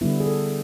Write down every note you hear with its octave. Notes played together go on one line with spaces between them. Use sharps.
D3 G3 B3 E4
G#4
A4